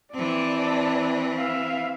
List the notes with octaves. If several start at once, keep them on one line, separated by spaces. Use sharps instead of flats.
E3 C4 D5 A5
E5 F5